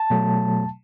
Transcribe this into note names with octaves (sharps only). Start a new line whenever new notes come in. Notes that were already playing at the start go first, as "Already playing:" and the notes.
Already playing: A5
B2 F#3 A3